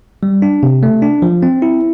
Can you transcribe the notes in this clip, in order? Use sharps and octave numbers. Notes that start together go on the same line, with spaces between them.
G3
D4
C3
A3
D4
F3
C4
E4